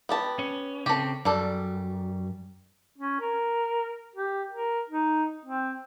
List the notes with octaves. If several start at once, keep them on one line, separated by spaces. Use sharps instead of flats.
B3 G4 A5
C#4
C#3 C4 G4 A4
F#2 G3 A4 D5
C#4
A#4
G4
A#4
D#4
C4